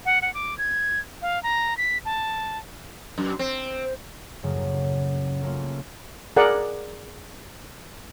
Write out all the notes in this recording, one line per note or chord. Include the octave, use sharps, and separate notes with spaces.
F#5
F#5
D6
G#6
F5
A#5
B6
A5
F#2
C4
F#2 A2 C#3 F#3 A#3
A3 A#3 C#4 F4
G#4 A#4 D5 F#5